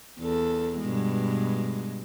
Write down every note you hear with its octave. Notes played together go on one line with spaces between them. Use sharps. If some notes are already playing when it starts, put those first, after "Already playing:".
E2 A4
G2 B2 G#3